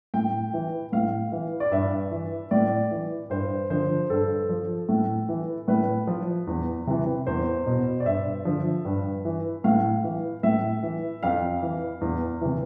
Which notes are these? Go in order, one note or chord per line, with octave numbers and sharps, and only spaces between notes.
A2 G5
E3
A2 F5
E3
D5
G2 E5
E3
A2 D5
E3
G2 C5
D3 F3 C5
G2 A4
F3
A2
E3
A2 B4
F3
E2
C3 E3
E2 C5
B2
D5
G2 E5
D3 F3
G2
E3
A2 F5
E3
A2 E5
E3
F2 F5
E3
E2
C3 E3